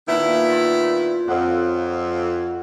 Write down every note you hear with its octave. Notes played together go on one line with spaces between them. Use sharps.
A#2 D#3 B3 D4 E4 F5
F4 F5
F2 C#3 D#5 F#5